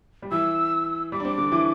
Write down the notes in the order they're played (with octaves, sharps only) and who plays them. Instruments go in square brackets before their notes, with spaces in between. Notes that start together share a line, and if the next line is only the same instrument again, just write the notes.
[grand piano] G3
[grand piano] E3 [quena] E6
[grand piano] G3 [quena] D6
[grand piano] D4
C4
D3
E3